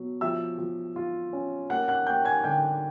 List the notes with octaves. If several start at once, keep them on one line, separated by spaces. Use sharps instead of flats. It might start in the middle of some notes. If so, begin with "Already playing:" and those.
Already playing: B2 F#3
F3 E5 E6
F3
F4
C#4
A#3 F#5 F#6
F#5 F#6
A#3 G5 G6
G#5 G#6
D3 G5 G6